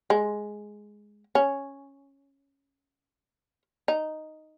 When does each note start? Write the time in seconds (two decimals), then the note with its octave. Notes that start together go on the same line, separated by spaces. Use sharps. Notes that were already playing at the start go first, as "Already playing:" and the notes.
0.10 G#3
1.35 C#4
3.88 D#4